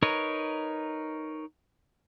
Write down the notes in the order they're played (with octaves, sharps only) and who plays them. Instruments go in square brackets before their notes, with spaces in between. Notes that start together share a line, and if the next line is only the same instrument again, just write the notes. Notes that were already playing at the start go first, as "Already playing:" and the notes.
[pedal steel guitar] D#4 A#4 B4 C#5